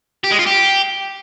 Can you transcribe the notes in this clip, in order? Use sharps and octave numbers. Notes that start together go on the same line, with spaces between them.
G4
G#3
F4
G4